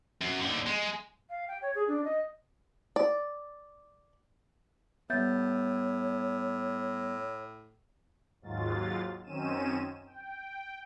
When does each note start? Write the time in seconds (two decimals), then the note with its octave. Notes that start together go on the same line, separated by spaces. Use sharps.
0.21 F#2
0.41 D#2 D3
0.67 G#3
1.30 F5
1.48 G5
1.62 C#5
1.75 G#4
1.88 D4
2.04 D#5
2.96 D5
5.10 A2 G3 B3 C#5 E5 G6 A6
8.42 D#2 G#2 F#3 F4 A6
9.24 F#2 D#3 C4 C#4 D#7 E7
10.06 G5